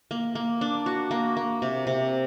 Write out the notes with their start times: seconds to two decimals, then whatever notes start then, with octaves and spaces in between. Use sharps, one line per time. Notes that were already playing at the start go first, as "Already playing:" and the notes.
0.11 A#3
0.35 A#3
0.61 D4
0.86 F#4
1.11 A#3
1.37 A#3
1.62 C3
1.87 C3